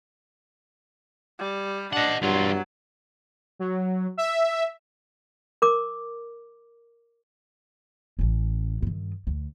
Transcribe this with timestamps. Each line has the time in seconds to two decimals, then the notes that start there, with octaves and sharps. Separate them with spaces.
1.39 G3
1.93 D4 D#5 F#5
2.22 E2 G2 F#3 F4
3.59 F#3
4.17 E5
5.62 A#4 D6
8.19 A1 C#4
8.82 G2 D#3
9.27 D2